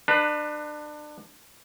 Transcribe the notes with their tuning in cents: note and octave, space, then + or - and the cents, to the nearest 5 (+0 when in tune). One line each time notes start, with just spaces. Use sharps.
D4 +30 B4 +0